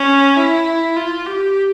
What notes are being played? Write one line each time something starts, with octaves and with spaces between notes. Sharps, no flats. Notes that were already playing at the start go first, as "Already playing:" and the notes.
Already playing: C#4
E4
F4
G4